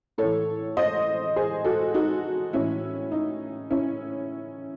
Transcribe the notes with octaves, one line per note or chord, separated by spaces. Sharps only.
A2 E3 A4 C#5
C5 D#5
G#4 C5
F#4 A4
D#4 F#4
A2 E3 C#4 E4
D#4
C#4 E4